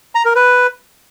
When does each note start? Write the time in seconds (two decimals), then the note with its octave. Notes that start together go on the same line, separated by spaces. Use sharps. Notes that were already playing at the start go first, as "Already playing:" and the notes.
0.15 A#5
0.25 A#4
0.36 B4